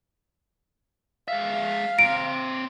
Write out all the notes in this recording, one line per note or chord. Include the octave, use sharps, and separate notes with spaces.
G#3 E5 F5
C4 A#5 D7